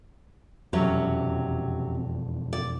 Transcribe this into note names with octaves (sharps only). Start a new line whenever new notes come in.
E1 F2 C3 F#3 C#4
D5